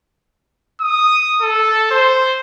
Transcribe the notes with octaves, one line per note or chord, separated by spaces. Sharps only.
D#6
A4
C5